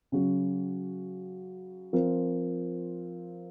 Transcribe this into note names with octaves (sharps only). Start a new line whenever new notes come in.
C#3 F#3 C#4 F#4
F3 C4 F4 A#4